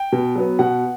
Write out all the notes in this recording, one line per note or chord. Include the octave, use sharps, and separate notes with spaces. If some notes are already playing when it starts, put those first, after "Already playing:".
Already playing: G5
B2
F#3 B3
B2 F#5